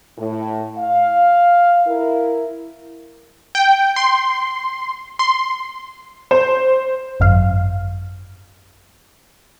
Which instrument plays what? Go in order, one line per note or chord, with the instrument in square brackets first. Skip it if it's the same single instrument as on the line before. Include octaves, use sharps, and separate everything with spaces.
[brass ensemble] A2
F5
E4 A#4
[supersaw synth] G5
C6
C6
[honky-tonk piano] C5
[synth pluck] G#1 F#2 F5